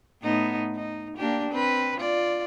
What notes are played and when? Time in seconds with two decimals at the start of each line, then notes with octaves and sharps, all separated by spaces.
0.23 A2 B3 D#4
0.75 D#4
1.17 A#3 D4 G4
1.51 C4 B4
1.98 F4 D5